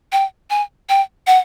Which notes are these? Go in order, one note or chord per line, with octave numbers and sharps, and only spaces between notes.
G5
G#5
G5
F#5